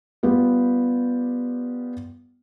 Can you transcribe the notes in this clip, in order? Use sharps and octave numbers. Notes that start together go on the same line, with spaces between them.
G3 B3 F4 G4